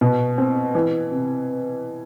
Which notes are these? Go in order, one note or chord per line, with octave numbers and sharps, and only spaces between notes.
B2
C4
E3
C3